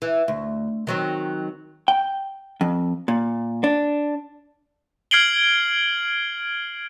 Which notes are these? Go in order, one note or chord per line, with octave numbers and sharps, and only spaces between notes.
E3
D2
D#3 F#3 C4
G5
F2
A#2
D4
F6 G#6 C7 D7 F#7 G7